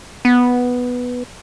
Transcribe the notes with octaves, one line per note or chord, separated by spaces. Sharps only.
B3